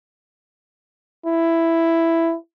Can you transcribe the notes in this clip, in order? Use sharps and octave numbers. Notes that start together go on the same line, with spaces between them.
E4